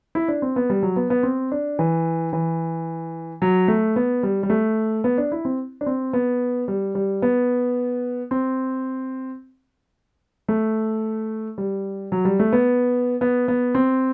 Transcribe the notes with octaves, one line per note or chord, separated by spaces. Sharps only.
E4
D4
C4
B3
G3
F#3
B3
B3
C4
D4
E3
E3
F#3
A3
B3
G3
G3
A3
B3
D4
E4
C4
D4
C4
B3
G3
G3
B3
C4
A3
G3
F#3
G3
A3
B3
B3
B3
C4